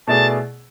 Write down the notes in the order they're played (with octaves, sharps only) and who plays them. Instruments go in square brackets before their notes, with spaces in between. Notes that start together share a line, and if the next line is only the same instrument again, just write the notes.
[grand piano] B2 A3 E4 G#4 D5 [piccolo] A5